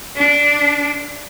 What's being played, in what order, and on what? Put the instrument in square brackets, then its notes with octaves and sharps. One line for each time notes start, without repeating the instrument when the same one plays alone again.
[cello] D4